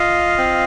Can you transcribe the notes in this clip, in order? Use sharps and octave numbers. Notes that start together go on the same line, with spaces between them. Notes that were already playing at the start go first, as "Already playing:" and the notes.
Already playing: F4 D#5 F5
C4